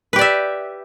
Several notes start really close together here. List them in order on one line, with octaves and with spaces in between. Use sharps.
B4 G4 D5 E5